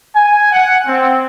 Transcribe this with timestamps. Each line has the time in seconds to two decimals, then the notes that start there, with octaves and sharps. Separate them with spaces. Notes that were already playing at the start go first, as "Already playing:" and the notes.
0.15 G#5
0.52 F#5
0.86 C4